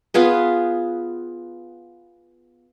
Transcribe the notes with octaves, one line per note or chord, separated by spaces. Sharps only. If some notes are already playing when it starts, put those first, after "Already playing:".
B3 F4 G#4 B4